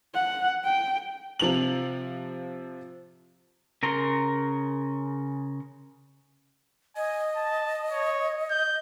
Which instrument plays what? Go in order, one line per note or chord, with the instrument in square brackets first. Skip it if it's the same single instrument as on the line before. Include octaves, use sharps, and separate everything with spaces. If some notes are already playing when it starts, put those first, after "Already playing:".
[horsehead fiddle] F#5
G5
[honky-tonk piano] C3 F3 F7 F#7
[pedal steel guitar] C#3 A#4 A#5 C6
[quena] D#5 [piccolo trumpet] G#5
[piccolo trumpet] A5
C#5
G6